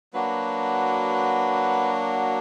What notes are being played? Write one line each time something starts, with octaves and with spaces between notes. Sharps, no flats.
F#3 A#3 D4 F#4 B4